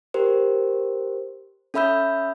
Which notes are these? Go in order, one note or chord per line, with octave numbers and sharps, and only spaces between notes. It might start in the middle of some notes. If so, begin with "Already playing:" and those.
G4 A#4 C5
C#4 A4 E5 B5 E6 G6